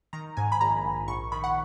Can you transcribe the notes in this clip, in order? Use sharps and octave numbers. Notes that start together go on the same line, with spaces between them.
D#3 A#5
G#2 G#5
B5
A#1 A#5
A#1
A#1 C#6
D#3 B5
F#5